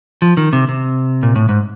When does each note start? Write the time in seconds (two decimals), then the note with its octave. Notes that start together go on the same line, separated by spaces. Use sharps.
0.22 F3
0.37 D#3
0.53 C3
0.69 C3
1.23 A#2
1.36 A2
1.49 G#2